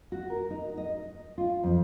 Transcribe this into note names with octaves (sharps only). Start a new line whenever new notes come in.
F#4
A#4
D#4
D#5
F4
F2